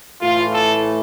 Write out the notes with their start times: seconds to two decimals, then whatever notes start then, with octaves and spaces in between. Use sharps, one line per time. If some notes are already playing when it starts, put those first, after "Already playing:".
0.21 A2 E3 A3 F4
0.53 A4